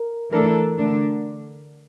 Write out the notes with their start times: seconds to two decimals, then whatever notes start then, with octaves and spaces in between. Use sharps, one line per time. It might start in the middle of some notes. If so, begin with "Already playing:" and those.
Already playing: A#4
0.32 E3 A3 D4 A4 A#4
0.78 D3 A3 D4